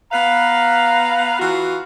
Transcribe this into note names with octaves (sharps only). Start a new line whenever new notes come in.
B3 B4 F5 A#5
E3 F4 F#4